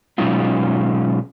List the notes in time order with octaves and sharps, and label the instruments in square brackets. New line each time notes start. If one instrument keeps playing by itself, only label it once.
[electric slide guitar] B2 F#3 G#3 C#4 D#4 F4